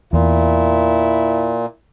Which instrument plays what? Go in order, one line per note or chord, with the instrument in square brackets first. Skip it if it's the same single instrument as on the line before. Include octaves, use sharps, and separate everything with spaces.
[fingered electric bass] E2 [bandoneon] A#2 [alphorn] E4